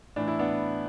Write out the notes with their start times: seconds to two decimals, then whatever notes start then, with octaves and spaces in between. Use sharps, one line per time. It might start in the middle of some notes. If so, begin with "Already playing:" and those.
0.16 A2 E3 D4
0.28 E4
0.39 B3 D4